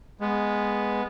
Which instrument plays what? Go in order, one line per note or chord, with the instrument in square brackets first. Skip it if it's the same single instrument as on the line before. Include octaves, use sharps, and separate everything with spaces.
[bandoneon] G#3 [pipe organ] B3